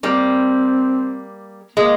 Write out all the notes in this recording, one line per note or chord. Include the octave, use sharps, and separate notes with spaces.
G3 A#3 C4
G#3 A#3